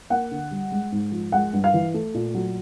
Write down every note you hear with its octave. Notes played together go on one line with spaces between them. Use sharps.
A#3 F#5
D3
G3
G#3
G#2
F3
G#3 F#5
G2
F5
E3
A3
A#2
F#3